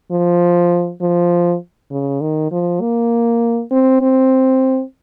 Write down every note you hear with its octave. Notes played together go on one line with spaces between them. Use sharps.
F3
F3
C#3
D#3
F3
A#3
C4
C4